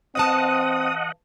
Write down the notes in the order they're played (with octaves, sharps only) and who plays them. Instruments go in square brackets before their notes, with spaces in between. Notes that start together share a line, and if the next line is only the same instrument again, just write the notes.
[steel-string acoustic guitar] E3 F5 A5 [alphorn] C4 [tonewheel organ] D#5 F#5 [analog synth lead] D#6